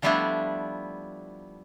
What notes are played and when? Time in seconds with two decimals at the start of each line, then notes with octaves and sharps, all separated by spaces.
0.02 F3 G3 A3 B3 D4 E4